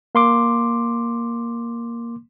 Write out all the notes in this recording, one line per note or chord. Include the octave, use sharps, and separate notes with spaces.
A#3 C6 D6